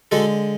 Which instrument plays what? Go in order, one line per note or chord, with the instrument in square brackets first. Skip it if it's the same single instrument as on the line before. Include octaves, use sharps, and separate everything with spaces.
[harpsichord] D3 G#3 F#4 A4